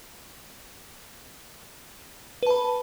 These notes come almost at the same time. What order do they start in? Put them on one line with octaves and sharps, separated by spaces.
B4 A5 B5